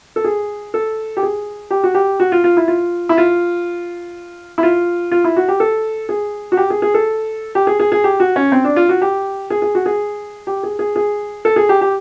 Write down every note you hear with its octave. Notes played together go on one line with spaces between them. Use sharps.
A4
G#4
A4
G4
G#4
G4
F#4
G4
F#4
F4
F4
E4
F4
E4
F4
E4
F4
F4
E4
F#4
G4
A4
G#4
F#4
G4
G#4
G#4
A4
G4
G#4
G#4
G#4
G4
F#4
C#4
C4
D4
F4
F#4
G4
G#4
G#4
F#4
G#4
G4
G#4
G#4
G#4
A4
G#4
G4
G4